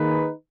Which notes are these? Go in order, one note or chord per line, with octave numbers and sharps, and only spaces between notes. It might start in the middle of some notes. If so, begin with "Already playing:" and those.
Already playing: D#3 A#3 D#4 G#4 B4